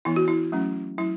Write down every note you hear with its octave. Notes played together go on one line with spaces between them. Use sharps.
E3 B3 E4
F#4
E4
F#3 A3 C#4
F#3 E4